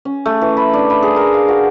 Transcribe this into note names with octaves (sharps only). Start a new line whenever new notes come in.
C#4
A3
E3
B5
D4
B5
G#4
A#4
F5
F#4